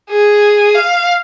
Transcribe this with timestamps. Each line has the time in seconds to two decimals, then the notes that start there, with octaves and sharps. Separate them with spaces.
0.10 G#4
0.75 F5